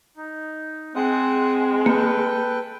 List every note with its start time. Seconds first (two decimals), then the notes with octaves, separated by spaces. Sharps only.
0.17 D#4
0.95 G#3 C4 F#5 D#6
1.86 A#3 A4 B4 G5